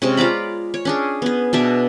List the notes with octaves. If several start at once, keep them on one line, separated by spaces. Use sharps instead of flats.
C3 G#3 C#4
F4 D5 A#5 B5
C#5
C#4 D4 G#4
B3 G#4
B2 D4 E5